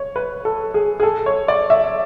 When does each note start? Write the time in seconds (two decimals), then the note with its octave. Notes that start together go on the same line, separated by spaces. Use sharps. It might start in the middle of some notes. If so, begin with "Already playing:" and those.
Already playing: C#5
0.16 B4
0.45 A4
0.74 G#4
1.00 G#4
1.03 A4
1.26 C#5
1.48 D5
1.70 E5